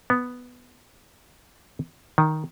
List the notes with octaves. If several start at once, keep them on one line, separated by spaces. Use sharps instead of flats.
B3
D#3